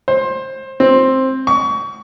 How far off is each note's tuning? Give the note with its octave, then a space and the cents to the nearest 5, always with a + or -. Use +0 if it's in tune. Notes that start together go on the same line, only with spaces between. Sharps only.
C5 +20
C4 +10
C#6 +30